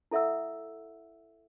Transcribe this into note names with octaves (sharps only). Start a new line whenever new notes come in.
E4 A4 E5 F#5 E6